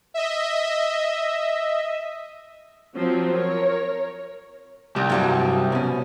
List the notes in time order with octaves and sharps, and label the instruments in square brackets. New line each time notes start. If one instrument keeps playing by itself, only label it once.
[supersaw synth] D#5 E5
[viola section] F3 F#3 C4
A#4 C#5
[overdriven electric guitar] C2 [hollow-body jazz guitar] G3
[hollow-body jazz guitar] G2 F#3 G3
B2 C#4